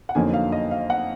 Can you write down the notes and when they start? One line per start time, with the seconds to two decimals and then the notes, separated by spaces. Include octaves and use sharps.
0.09 F#5
0.15 F2 D3 F#3 A#3 D#4 G#5
0.34 F5
0.52 D#5
0.71 F5
0.90 F#5